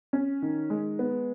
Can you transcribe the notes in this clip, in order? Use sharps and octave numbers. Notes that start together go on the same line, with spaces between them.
C#4
D#3
G#3
B3